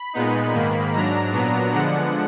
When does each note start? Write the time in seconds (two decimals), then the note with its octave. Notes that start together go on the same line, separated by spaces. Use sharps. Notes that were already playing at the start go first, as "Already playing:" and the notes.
Already playing: B5
0.13 A#2 G#3 B3 D#4
0.53 G#2 D#3 A#3
0.93 G#2 F#3 D4 A#5
1.33 A#2 F#3 B3 D4
1.72 D3 F3 G#3 B3 D4 F#5